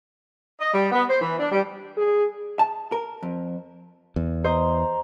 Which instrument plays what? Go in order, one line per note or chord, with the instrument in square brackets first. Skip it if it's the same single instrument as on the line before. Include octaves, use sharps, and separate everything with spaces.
[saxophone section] D#5
G3
B3
C5
E3
D4
G3
[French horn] G#4
[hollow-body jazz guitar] A5
A#4
F2
[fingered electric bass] E2
[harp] C5 D#5 [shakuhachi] A#5